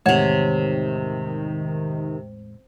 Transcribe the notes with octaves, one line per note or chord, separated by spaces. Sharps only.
E2 A2 C3 D#3 G#3 C#5 F#5 A5